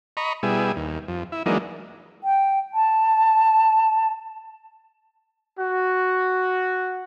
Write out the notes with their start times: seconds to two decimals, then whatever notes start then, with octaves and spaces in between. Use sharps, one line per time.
0.17 D#5 A#5 B5 C#6
0.43 B2 G3 E4 G#4
0.77 D#2
1.08 F2
1.32 E4
1.46 E3 F#3 G#3 A#3 D4 D#4
2.24 G5
2.74 A5
5.59 F#4